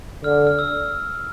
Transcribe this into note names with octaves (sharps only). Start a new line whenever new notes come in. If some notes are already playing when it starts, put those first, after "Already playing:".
D3 F6
F6
E6